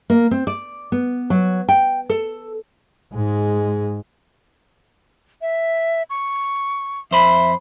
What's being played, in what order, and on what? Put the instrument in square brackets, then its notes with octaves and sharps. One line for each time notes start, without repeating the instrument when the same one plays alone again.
[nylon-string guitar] A#3
C4
D5
B3
F#3
G5
A4
[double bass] G#2 G#3
[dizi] E5
C#6
[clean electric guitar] F2 C5 B5 [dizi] E5